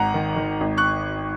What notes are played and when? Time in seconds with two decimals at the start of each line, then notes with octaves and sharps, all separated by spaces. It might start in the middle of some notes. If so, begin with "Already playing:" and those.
Already playing: G#1 F#5 A#5
0.14 D#3
0.36 D#3
0.60 G#1
0.77 C#6 F#6